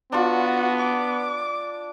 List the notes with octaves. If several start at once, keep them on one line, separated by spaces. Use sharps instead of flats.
B3 D4 F4 F#4
D6